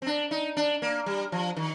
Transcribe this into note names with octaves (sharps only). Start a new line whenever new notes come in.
C4
D4
D#4
D4
A#3
G3
F3
D#3